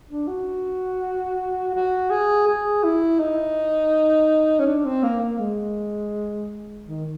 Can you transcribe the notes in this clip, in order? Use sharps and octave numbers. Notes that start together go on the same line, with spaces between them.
D4
F#4
F#4
G#4
G#4
E4
D#4
C#4
D4
C4
A#3
A#3
G#3
D#3